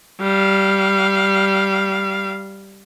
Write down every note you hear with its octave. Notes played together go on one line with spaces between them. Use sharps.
G3 F5